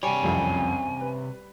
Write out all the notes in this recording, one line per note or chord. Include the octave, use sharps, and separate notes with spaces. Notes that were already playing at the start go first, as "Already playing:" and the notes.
C3 G3 C#5 G#5
F#1 C2 F2
B4